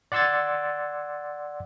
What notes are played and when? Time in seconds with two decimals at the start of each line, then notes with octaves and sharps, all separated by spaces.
0.12 D5 F#5 C6 E6 G#6 A6